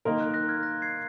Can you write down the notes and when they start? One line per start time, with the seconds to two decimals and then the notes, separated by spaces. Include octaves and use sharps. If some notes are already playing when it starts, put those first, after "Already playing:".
0.05 D#3 A#3 D#4 A#4 C6
0.20 F#6
0.34 F#6 A#6
0.49 F6 G#6
0.63 F#6 A#6
0.82 G#6 C7